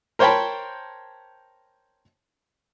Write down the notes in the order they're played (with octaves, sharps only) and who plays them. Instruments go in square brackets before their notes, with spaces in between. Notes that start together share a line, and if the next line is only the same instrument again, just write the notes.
[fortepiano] A#4 C5 C#5 G5 A5 B5